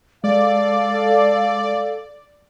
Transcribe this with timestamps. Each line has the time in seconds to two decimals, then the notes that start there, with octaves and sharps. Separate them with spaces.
0.24 G#3 A4 D5 F5